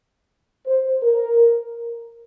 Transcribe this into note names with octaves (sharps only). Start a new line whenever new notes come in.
C5
A#4